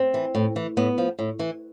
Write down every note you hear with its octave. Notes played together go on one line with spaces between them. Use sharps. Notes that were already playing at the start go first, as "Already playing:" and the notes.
Already playing: C4
E3
A2
E3
A2 B3
F3
A2
E3